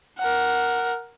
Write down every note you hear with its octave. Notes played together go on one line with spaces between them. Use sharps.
A#4 F#5